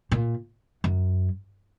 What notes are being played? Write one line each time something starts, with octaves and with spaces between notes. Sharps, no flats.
A#2
F#2